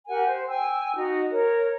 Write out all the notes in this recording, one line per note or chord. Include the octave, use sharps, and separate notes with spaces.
G4 A#4 F#5 G#5
C5
G5 G#5 E6
D#4 F#4 D#5
A#4 C#5